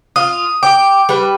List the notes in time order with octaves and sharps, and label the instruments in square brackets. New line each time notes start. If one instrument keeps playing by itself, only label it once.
[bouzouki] F4 [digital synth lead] D#6
[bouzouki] G5 [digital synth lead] D6
[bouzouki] G3 B4